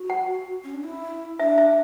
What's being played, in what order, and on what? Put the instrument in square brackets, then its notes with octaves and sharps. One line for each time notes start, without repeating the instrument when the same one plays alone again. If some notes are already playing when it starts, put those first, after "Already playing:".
Already playing: [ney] F#4
[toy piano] F#5
[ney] C#4
D4
E4
[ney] D4 [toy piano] E5
[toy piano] E5